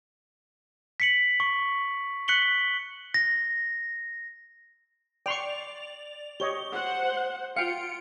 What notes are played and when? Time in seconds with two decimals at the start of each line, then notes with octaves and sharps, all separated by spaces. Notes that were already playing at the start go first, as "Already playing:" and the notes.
1.00 B6 C#7 F#7
1.40 C#6
2.28 F#6 B6 C#7 F#7 G7
3.14 A#6
5.26 D5 G5 C6 C#6 F7
6.40 G4 C#5 D#5 G7
6.72 C5 F#5
7.56 F4 F5 G5 C#7 D7